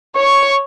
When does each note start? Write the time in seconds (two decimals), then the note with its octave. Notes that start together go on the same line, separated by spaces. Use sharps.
0.16 C#5 C#6